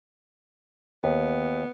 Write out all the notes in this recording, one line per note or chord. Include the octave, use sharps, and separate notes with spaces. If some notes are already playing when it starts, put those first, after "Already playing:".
D#2 B3